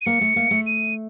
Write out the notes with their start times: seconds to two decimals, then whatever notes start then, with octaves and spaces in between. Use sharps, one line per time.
0.01 D#7
0.06 A#3 C#7
0.21 A3
0.36 A#3
0.51 A3
0.67 D#7